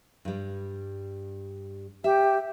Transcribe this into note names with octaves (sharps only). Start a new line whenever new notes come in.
G2 G3
G4 E5